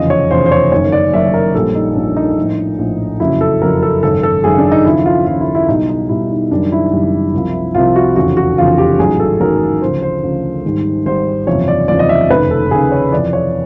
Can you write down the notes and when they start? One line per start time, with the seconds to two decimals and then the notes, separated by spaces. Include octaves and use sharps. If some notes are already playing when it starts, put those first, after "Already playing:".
Already playing: F1 E2 C#3 F3 D#5
0.10 C#5
0.30 F1 E2 C#3 F3 C5
0.46 C5
0.52 C#5
0.72 F#1 F#2 D#3 C#5
0.92 D5
1.13 F#1 F#2 D#3 E5
1.34 A#4
1.55 A#1 A#2 G3 A4
1.75 D#4
1.96 A#1 A#2 G3 D4
2.17 D#4
2.37 A#1 A2 F3
2.79 A#1 A2 F3
3.20 F#1 F2 C#3 F#3 E4
3.41 A4
3.61 F#1 F2 C#3 F#3 A#4
3.82 A4
4.03 G#1 F#2 C#3 A4
4.23 A4
4.44 G#1 F#2 C#3 G#4
4.58 D4
4.72 D#4
4.86 D#2 C#3 F3 E4
5.06 F4
5.26 D#2 C#3 F3 F4
5.41 E4
5.55 E4
5.68 B1 B2 G3 D#4
5.89 D#4
6.09 B1 B2 G3 E4
6.30 D#4
6.51 F#1 F#2 D#3 G3 D4
6.72 E4
6.92 F#1 F#2 D#3 G3
7.34 C2 C3 F3
7.75 C2 C3 F3 F4
7.96 F#4
8.16 F1 E2 C#3 F3 F#4
8.37 F#4
8.58 F1 E2 C#3 F3 F4
8.78 G4
8.99 A1 G#2 D#3 F#3 G#4
9.20 A4
9.40 A1 G#2 D#3 F#3 A#4
9.82 D2 C#3 F3 C5
10.02 C5
10.23 D2 C#3 F3
10.64 G#1 G#2 D#3 G3
11.06 G#1 G#2 D#3 G3 C5
11.47 F#1 E2 C3 F3 C#5
11.68 D5
11.88 F#1 E2 C3 F3 D5
11.99 D#5
12.09 E5
12.30 F1 D#2 C#3 B4
12.51 A4
12.71 F1 D#2 C#3 G#4
12.92 C#5
13.12 F2 C3 E3 D5
13.33 C#5